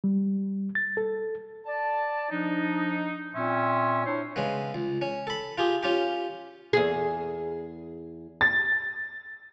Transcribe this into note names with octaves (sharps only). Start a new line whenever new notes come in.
G3
A6
A4
D5 A5
F3 D4 D#4
A#2 C4 C#4 E5 C6
D4 E4 C5 C#5
C#3 G#3 B3
C#2
C#4
A4 B5
F4 G4 G#4
C#4 F4 G4
E2 G#4
A6